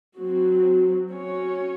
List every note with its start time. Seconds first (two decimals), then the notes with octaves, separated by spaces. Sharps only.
0.17 F#3 C4 F#4
1.11 C#4 F#4 C#5